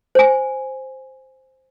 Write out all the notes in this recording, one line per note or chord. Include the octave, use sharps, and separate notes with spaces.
C5 G#5